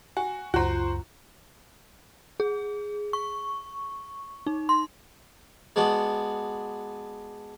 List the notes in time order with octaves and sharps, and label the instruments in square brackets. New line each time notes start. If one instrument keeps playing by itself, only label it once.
[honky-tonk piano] F#4 [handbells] G#5
[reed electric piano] C#2 F#2 [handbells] F4 A#5 [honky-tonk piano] F#4 C5
[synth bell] G#4
C#6
D#4
C6
[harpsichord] G#3 B3 D4 F#4